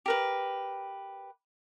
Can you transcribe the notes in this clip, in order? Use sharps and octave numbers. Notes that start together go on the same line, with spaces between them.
G4 A#4 B4